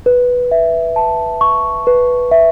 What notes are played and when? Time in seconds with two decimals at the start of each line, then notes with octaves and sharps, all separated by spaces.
0.06 B4
0.51 E5
0.96 A5
1.41 C#6
1.87 B4
2.31 E5